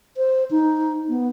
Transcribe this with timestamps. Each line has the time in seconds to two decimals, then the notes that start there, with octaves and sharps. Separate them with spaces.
0.17 C5
0.51 D#4
1.09 B3